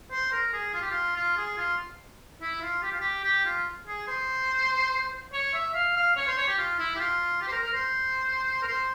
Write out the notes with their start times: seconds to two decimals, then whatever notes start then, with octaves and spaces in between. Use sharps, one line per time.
0.11 C5
0.32 A#4
0.53 G#4
0.74 F4
0.82 G4
0.90 F4
1.16 F4
1.37 G#4
1.58 F4
2.41 E4
2.62 F4
2.83 G4
2.92 F4
3.00 G4
3.24 G4
3.45 F4
3.88 G#4
4.07 C5
5.33 C#5
5.54 E5
5.74 F5
5.96 F5
6.16 C#5
6.27 C5
6.38 C#5
6.48 G4
6.58 F4
6.79 E4
6.96 G4
7.00 F4
7.41 G4
7.48 C5
7.52 A#4
7.63 A#4
7.73 C5
8.62 A#4
8.67 C5